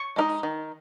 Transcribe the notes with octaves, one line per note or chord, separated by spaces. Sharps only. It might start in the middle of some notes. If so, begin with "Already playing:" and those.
Already playing: C#6
G#3 D#4 A#4 D#5
D#3